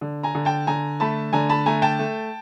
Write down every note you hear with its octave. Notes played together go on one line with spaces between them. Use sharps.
D3
G#5 A#5
D3
G5 A5
D3 G#5 A#5
A3 A5 B5
D3 G#5 A#5
A5 B5
A3 G#5 A#5
G5 A5
A3